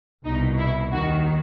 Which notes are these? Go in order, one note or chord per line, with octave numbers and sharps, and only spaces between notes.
C2 B2 D#4
E4
D#2 D#3 F#4